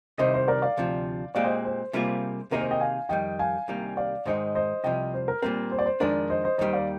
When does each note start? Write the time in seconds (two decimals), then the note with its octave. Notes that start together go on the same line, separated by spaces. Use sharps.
0.18 C2 C3 D#3 C5 D#5
0.34 C5
0.48 A#4 D5
0.62 D5 F5
0.77 D2 C3 F3
1.35 A#2 G#3 C4 G4 D5 F5
1.44 C5 D#5
1.65 C5
1.93 C3 G3 A#3 F4 G#4
2.51 C3 D#3 A#3 D#4 G#4 A#4
2.61 C5
2.71 D#5 G5
2.80 F5 G#5
3.09 F2 D#3 G3 D#5 G5
3.39 F5 G#5
3.68 C2 C3 D#3 G3 A#3
3.97 D5 F5
4.25 G#2 D#3 G#3 D#4 C5 D#5
4.55 C5 D#5
4.84 C2 C3 F3 D#5 G5
5.14 C5
5.28 A#4
5.42 A#2 G3 C4 A#4
5.72 C5
5.79 D5
5.86 C5
6.00 F2 D#3 G#3 D4 A#4 D5
6.30 C5 D#5
6.44 C5 D#5
6.58 D#2 D#3 G3 C5 D#5
6.73 D5 F5